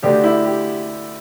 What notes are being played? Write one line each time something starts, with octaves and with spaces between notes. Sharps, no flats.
D2 D3 A3 D4 G4
E4
G4